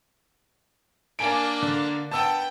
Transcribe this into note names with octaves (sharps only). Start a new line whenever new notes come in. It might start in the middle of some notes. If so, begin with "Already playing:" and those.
A#3 D4 G#5 D7
D3
B3 G5 A5 E6